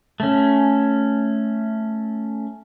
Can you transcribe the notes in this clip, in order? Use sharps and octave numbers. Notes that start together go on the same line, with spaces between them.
A3 C#4